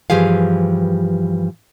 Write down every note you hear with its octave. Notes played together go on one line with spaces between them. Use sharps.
G2 E3 F3 G4 G#4 F5